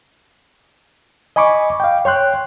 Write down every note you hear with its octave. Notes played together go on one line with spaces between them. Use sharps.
D#5 G#5 B5 C#6 D6
F5 G5
C#5 G5 C6 F#6